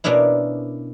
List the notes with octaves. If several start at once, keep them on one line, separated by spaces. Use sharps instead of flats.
B2 A#3 C#4 D4 E4